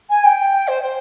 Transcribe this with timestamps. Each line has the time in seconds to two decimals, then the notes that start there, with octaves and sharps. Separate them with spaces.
0.09 G#5
0.24 G5
0.67 C5
0.82 C5